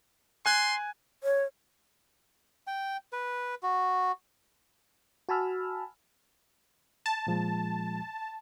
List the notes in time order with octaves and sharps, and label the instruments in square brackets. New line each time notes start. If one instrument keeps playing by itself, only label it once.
[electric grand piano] G#5 F#6 G#6 [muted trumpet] C6
[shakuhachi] C#5
[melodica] G5
B4
F#4
[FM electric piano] F#4 G#5 A5 B5 E6 F6
[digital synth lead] A5
[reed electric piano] A#2 F3 G#3